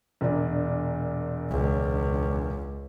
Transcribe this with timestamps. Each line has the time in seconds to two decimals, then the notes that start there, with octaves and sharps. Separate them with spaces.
0.21 E1 A#2 D4
1.50 C#2